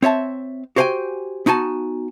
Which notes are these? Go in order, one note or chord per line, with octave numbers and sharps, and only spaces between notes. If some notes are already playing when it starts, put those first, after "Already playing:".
C4 C#5 E5 A5
F#4 G4 C5 F5 G5 G#5
B3 D#4 F#4 G#5 A5